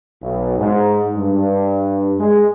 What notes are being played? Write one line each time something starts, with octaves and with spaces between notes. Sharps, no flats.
B1
G#2
G2
G#3